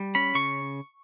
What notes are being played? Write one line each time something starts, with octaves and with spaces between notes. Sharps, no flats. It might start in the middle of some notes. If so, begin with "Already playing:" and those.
Already playing: G3
C#4 B5
C#3 C#6